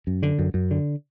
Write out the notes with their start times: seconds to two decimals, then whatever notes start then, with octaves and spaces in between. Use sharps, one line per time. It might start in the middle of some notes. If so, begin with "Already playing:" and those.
0.07 F#2
0.23 D3
0.39 F#2
0.54 F#2
0.71 D3